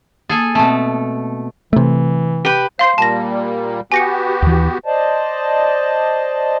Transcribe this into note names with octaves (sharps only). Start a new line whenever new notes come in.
A#3 G#4 A4 G#5 A6
B2 A3 C4 A5
C3 E3 A3
G4 B4
C5 F5 C6 C7
A#2 G3 A#3 A5 A#6
B3 F#4 G4 G#5 A#6 C#7
D#2 E3
C5 D5 D#5 A5